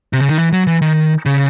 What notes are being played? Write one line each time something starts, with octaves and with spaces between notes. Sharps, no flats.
C3
C#3
D#3
E3
F#3
E3
D#3
C#3